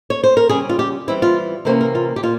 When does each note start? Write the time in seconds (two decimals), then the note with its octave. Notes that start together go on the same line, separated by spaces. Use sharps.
0.10 C#5
0.24 C5
0.37 A#4
0.49 C#3 G3 C#4 G#4
0.69 F4
0.79 G4
1.08 E3 G3 C4 E4
1.22 F4
1.65 C3 E3 A#3 C#4 C5
1.81 A#4
1.95 F4
2.16 G4
2.23 A#2 F4